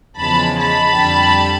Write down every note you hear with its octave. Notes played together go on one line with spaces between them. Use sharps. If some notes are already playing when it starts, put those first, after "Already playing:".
E2 C#3 F3 G#3 A5 B5
A5 B5
F2 D3 G3